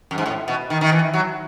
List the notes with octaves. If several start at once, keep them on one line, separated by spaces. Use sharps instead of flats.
F#2
G#2
A2
B2
D#3
D#3
E3
F#3